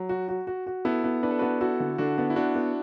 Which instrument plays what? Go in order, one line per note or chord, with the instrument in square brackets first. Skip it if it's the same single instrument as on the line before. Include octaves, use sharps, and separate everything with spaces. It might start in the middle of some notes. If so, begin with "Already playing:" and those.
Already playing: [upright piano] F#3
F#4
F#4
F#4
F#4
[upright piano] B3 [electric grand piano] E4 A4
[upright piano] B3
[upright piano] D4 [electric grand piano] B4
[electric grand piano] A4
F#4 B4
[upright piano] B3
[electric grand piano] E4 A4 [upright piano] F#4
[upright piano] D3
[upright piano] D3 [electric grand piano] D4 F#4
[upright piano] B3
[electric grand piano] E4
[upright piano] B3 [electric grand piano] D4 F#4
[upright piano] B3